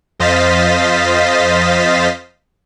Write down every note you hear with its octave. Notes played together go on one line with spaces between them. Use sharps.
F2 C5 D#5 F5 A6 B6